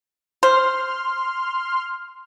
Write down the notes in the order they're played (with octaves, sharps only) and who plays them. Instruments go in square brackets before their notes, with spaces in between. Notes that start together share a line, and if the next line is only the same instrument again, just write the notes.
[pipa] C5 [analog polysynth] C6 F6